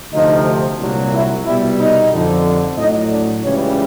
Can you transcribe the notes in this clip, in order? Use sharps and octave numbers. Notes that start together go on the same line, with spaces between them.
D2 C3 F3 D#4 D#5
C2 A#2 F#3
E4 E5
C2 B2 G3 E4 E5
D#4 D#5
F2 D3 F3
A2 F#3 D#4 D#5
D4 D5
C#2 C#3 E3 G3 C#4 C#5